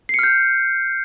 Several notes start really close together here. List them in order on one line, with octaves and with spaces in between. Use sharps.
C7 C#7 F6 G6